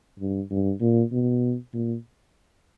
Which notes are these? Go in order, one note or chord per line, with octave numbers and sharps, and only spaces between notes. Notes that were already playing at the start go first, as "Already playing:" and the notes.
G2
G2
A#2
B2
A#2